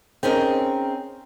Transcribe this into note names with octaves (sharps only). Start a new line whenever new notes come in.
C4 C#4 D#4 G#4 A#4